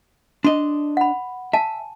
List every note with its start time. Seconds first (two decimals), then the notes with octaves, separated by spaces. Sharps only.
0.44 D4 D#5 C6
0.97 F#5 B5
1.53 E5 G#5 A5